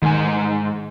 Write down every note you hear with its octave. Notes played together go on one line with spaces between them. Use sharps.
G#2 D#3 G#5